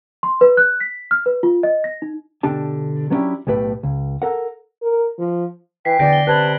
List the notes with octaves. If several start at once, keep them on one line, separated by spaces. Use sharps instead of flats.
C6
B4
F#6
B6
F6
B4
F4
D#5
A#6
D#4
B2 D3 D4 G4 A5
F#3 B3 C#4 D4 E4 G4
B1 A2 G4 B4
C#2
A4 A#4 F#5
A#4
F3
E3 G5 B6 C7
E2 D3 D5 G6 A#6 D7
G7
C3 B4 A5 F#6 G#6 F#7